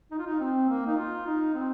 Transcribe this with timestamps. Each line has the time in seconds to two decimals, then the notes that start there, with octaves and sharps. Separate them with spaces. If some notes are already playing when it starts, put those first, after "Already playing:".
0.11 D#4
0.18 F4
0.26 D#4
0.40 C4
0.69 A#3
0.87 D#4
0.97 F4
1.26 D#4
1.54 C4